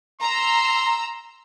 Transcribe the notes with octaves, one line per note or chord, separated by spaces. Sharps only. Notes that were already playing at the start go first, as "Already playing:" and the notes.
A#5 C6 E6